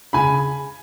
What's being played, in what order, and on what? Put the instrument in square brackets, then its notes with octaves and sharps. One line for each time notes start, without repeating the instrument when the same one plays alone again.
[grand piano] C#3 G#5 B5